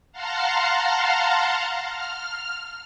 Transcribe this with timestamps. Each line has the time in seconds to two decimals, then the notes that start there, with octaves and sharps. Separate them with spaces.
0.12 F5 F#5 A5 A#5 C6 F6
1.86 F6